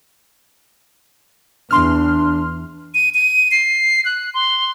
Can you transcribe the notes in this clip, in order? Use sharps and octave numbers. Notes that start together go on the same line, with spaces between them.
E2 D4 C6 F6
D#7
D#7
C7
F#6
C6